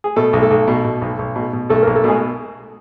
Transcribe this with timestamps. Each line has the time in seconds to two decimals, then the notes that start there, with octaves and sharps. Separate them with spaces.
0.04 G#4
0.16 B2 A3 A4
0.33 B1
0.42 A3 A4
0.51 B1
0.68 B2
0.85 B2
1.02 B1
1.19 B1
1.36 B2
1.53 B2
1.69 B1 A3 A4
1.83 B1 A#3 A#4
1.96 A3 A4
2.04 B2 G#3 G#4